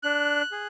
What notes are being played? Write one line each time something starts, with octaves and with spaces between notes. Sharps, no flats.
D4 F#6
G#4